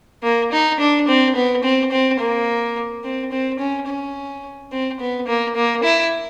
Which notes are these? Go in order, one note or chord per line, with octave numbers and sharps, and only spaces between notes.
A#3
D#4
D4
C4
B3
C4
C4
A#3
C4
C4
C#4
C#4
C4
B3
A#3
A#3
E4